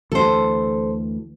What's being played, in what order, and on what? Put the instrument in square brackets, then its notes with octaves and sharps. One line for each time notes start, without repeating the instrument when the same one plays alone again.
[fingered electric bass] D2 E3 [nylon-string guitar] A4 C5